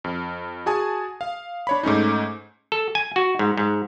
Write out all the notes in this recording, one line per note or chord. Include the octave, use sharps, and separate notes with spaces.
F2
F#4 G#4 G#5 A5 D#6
F5
D4 C#5 B5
G#2 A3 C#4 D#4
A4
G#5
F#4
G#2
G#2